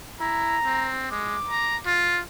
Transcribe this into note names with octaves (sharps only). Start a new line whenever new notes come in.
E4 A#5
C4
G#3 D6
A#5
F4